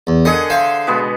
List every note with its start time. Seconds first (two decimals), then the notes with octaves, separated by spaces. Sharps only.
0.07 E2
0.25 D3 G#4 A#4 D#5 F#5
0.50 C5 E5 F5
0.87 B2 G#3 B3